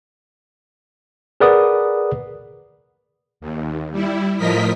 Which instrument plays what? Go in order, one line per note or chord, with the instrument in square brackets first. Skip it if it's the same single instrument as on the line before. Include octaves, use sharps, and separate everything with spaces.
[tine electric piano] G#4 A#4 B4 D5 F#5 D#6
[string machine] D#2
G3 E4
A2 F3 A#4 D#5 B6